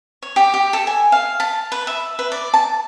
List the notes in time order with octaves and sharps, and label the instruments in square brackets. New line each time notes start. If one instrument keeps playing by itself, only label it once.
[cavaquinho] C#5
G4
G4
A4
G#5
F5
A5
B4
E5
B4
D5
A5